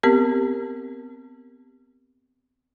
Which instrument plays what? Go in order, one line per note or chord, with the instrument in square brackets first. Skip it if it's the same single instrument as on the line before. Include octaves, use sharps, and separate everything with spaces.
[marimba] B3 C4 G4 A#4